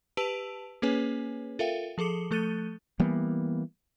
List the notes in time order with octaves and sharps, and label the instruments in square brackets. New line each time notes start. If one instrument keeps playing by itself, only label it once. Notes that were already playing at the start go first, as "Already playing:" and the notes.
[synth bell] G4 B4 A5 E6 D7 F#7
A#3 C#4 G#4 B4 C#5 G#5
F4 A4 A#4 E5 F5 G5
F3 G#4 A4 D6 C#7
F3 A3 A4 F#6 A6 D#7
[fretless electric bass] E3 G3 A#3 B3